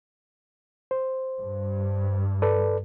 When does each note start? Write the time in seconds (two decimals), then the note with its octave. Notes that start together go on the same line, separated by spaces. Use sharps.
0.91 C5
1.40 G2
2.42 A4 B4 D5